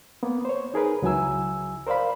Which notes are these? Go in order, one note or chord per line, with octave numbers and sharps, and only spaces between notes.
A#3 B3
C5 C#5
D#4 G#4 A#4 B4
C#2 F#3 E4 G#5 E6
A#4 C5 D5 F5 B5